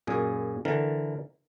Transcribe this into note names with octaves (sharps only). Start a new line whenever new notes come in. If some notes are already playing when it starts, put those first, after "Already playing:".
F#2 A#2 G#4
D3 E3 A#4